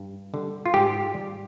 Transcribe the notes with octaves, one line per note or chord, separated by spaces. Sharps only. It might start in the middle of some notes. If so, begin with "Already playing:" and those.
Already playing: G2
D3 G3
F4
G#2 G4
G3